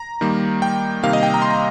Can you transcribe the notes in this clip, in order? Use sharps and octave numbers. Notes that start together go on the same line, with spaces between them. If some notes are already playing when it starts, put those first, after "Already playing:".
Already playing: A#5
D#3 G3 A#3
G5
C3 D#3 G3 A#3 F5
D#5
G5
A#5
C6
A#5